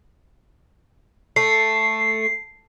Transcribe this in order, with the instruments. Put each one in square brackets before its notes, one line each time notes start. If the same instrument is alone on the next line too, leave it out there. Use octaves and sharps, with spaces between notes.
[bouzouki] A3 [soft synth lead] C7